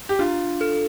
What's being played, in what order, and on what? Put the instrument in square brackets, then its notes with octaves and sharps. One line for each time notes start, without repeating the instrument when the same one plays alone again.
[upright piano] G4
[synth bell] D4 [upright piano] F4
[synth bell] A4